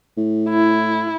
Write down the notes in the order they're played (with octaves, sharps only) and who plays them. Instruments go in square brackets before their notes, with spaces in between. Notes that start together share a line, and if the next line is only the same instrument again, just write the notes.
[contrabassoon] A2
[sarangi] E4